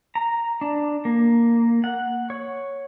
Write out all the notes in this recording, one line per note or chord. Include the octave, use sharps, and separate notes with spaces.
A#5
D4
A#3
F#5
C#5